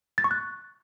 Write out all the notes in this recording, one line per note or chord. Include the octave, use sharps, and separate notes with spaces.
A6
C#6
F#6